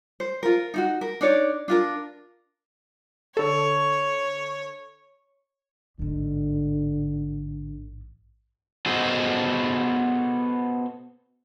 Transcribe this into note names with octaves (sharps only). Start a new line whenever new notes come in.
C5
F4 A#4
D#4 E4 F#4
A#4
D4 D#4 C#5 D5
D4 F4 A#4
D3 A4 C#5
A1 G#2 D3
B3 F#4 G#4 A4 C5 D#5